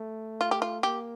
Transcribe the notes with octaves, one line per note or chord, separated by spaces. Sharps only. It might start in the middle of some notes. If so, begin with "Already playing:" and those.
Already playing: A3
F4
G4
F4
A#3 G4